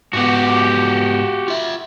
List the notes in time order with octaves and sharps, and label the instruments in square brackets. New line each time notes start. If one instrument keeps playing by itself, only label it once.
[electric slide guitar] G#2 B3 [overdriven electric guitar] F#4 G4
[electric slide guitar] F4 E5